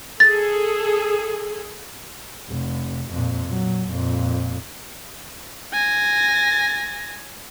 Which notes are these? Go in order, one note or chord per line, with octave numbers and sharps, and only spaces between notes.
G#4 A4 A6
F1
F2 A#2
A#2 F#3
F2 A#2
G#5 A#6